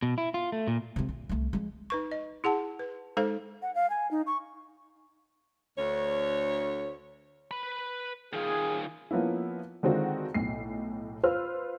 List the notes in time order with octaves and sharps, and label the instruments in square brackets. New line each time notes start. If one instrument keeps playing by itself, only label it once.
[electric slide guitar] B2
E4
F4
A3
A#2
[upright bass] C3 G#3
A#1
C2 A3
F3 G#3
[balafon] D#4 B4 C#6
D#5
E4 G#4 F#5 A5
B4
G#3 D#4 A4 C5 F5
[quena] F#5
F5
G#5
D#4
C#6
[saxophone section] D2 C#5
[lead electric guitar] B4 B5
[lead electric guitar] D#3 F4 [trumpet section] G#4
[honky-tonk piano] F3 A#3 B3 C#4 E4
D3 D#3 G#3 C4 F4 F#4
B1 A2 C7
F4 B4 C5 E6 F6